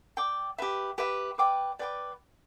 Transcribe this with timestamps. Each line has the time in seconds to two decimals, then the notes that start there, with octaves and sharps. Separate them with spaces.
0.17 D5 G5 D6
0.58 G4 B4 E5
0.98 G4 B4 E5
1.38 B4 D5 G5 D6
1.79 B4 D5 G5 D6